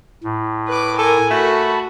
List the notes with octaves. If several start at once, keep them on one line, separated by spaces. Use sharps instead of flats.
A2
B4 D6
A4 A#4 G#5
A3 F#4 A5 B5